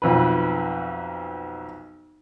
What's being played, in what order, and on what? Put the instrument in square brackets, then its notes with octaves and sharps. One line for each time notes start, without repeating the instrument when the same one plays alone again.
[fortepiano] B1 F2 B4